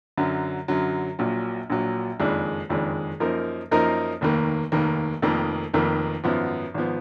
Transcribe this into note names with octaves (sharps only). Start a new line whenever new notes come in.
F#2 D3 F#3
F#2 D3 F#3
A#1 A#2 F#3
A#1 A#2 F#3
F#1 F2 D#3 G#3 D4
F#1 F2 D#3 G#3 D4
F#2 F3 A#3 D#4 A#4
F#2 F3 A#3 D#4 A#4
F1 D#2 D#3 A#3
F1 D#2 D#3 A#3
F1 F2 D#3 A#3
F1 F2 D#3 A#3
G#1 F#2 F3 B3
G#1 F3 B3